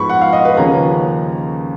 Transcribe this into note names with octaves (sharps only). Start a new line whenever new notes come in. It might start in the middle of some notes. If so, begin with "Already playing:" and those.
Already playing: G#2 F3 B3 B5 C#6
F#5
F5
D#5
B4
D#2 C#3 F3 A#3 C#4 A#5